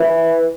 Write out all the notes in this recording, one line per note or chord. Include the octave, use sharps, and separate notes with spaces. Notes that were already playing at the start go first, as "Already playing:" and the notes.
Already playing: E3